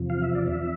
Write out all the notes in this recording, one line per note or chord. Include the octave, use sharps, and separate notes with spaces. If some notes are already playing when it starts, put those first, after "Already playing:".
Already playing: E2 C3 F3
F5
E5
D5
E5